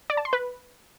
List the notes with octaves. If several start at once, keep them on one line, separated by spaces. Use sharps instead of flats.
D5
A5
C6
B4